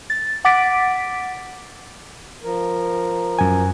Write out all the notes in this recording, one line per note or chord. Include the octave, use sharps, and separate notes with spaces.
A6
F#5 D6 A6 B6 D7
F3 A#4
F#2 G#5